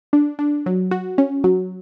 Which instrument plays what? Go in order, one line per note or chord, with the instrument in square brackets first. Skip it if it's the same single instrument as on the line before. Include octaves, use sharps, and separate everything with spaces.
[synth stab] D4
D4
F#3
F#4
C#4
F#3